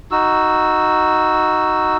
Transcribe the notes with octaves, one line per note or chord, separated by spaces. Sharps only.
D#4 F#4 E6